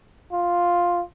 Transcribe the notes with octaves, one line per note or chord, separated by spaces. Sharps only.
F4